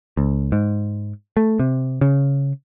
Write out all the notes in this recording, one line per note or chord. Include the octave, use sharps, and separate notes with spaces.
C#2
G#2
A3
C3
C#3